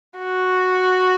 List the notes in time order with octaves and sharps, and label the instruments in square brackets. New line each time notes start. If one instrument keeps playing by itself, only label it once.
[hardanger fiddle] F#4